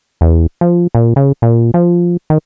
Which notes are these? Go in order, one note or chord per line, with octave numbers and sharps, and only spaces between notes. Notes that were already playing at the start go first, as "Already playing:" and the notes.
E2
F3
A#2
C#3
A#2
F3
D#3